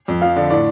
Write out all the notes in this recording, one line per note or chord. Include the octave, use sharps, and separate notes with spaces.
F2
F3 F5
D3
A2 D5